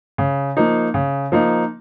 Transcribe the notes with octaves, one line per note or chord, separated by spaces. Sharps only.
C#3
F3 A#3 D#4
C#3
F3 A#3 D#4